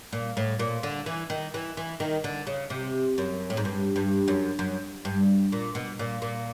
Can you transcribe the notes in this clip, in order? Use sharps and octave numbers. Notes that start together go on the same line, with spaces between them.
A#2
A2
A#2
D3
E3
D#3
E3
E3
D#3
D3
C#3
C3
F#2
A2
G#2
G2
G2
F#2
F#2
G2
A#2
B2
A#2
A#2